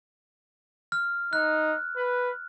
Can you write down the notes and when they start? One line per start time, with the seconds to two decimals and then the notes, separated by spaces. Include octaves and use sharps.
0.92 F6
1.33 D#4 F#6
1.96 B4